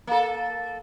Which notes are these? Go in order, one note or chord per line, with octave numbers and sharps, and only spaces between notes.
A#3 A4